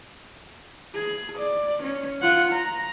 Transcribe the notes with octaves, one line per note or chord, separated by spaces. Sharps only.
G#4
D5
C#4
F4 F#5
A#5